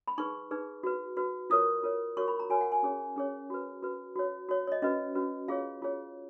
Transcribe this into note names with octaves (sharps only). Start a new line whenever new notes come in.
B5
D#4 G#4 B4 C#6
D#4 G#4 B4
F#4 B4
F#4 B4
F4 A#4 C#5 D#6
F4 A#4 C#5
F#4 A#4 C#5 C#6
B5
A#5
F#4 A#4 C#5 G#5
F#5
G#5
C#4 G#4 C#5
C#4 G#4 C#5
F#4 B4
F#4 B4
F#4 C#5
F#4 C#5
C#5
D#5
C#4 F#4 B4 D#5
C#4 F#4 B4
F4 G#4 C#5 F5
F4 G#4 C#5